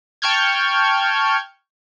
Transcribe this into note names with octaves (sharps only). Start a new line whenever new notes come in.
G5 A5 C#6 F6 G6 G#6